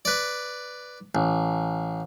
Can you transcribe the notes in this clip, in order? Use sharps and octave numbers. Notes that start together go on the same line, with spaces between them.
B4 D5
A1